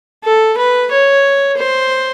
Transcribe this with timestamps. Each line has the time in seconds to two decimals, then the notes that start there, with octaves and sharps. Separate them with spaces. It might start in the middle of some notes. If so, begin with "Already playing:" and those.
0.24 A4
0.57 B4
0.91 C#5
1.57 C5